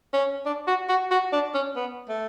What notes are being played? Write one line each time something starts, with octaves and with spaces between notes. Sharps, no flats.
C#4
D4
F#4
F#4
F#4
D4
C#4
B3
A3